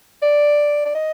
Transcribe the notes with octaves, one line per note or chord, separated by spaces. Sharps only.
D5
D5
D#5